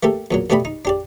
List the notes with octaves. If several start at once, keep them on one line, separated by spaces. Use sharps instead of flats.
A3 A#3 G4 A4
E2 A#2 F#3
D2 B2 A3 G4 D5 B5
D#4
D4 G4 D5